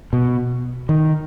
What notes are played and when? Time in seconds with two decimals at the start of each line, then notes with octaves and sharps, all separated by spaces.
0.13 B2
0.89 D#3